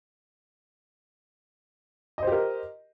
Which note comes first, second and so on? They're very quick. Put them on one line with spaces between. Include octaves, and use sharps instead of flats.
D#5 C5 G4 A#4